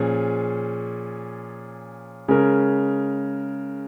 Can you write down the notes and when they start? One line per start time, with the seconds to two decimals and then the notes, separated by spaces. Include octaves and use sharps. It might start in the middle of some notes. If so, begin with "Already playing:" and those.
Already playing: A#2 F3 C#4 G#4
2.28 C#3 G#3 C#4 A#4